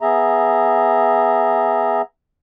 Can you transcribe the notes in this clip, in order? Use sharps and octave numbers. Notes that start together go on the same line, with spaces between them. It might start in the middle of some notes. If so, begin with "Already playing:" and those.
B3 G#4 E5 A#5